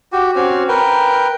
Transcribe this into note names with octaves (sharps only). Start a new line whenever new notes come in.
F#4 G4
C4 C#4 F#4
A#4 B4 G5